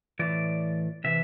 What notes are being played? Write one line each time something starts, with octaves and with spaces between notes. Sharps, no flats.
A2 E3 D5
C3 E3 E5